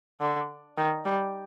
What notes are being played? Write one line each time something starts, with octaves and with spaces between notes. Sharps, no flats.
D3
D#3
G3